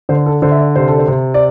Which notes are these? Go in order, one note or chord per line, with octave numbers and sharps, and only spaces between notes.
D3 C5
A4
D3 C5
E5
D5
C3 C5
A4
C5
C3
D5